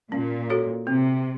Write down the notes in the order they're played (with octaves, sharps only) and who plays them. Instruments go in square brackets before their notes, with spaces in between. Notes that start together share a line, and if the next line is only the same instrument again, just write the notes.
[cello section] A#2 [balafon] C#4
[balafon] F#4 A4 C#5
[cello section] C3 [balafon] C4